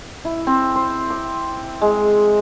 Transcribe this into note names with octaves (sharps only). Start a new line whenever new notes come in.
E4
C4
C5
D6
G#3